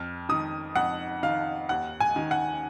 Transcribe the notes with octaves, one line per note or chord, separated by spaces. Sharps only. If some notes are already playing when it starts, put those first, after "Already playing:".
Already playing: F2 F6
D#3 D#6
F2 F#5
D#3 F5
D#2 F#5
G#5
D#3
F#5